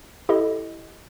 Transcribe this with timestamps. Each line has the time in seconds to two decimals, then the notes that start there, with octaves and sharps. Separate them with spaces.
0.29 E4 G4 A4 D#5